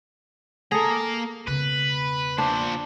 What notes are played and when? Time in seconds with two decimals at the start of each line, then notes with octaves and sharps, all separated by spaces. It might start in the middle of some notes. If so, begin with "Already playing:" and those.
0.72 A#3 G#4 A4 A#5
1.48 E1 C#3 B4
2.38 A#2 D4 C5